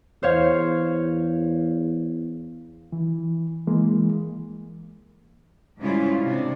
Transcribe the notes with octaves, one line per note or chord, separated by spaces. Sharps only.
E2 C5 C#5 F5
E3
E3 G#3 A#3
G#2 C#3 G3 C#4 E4 F4
C3 D4